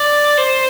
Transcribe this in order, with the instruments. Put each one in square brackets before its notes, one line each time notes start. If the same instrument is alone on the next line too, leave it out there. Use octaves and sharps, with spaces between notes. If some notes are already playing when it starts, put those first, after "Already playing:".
Already playing: [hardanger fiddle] D5
C5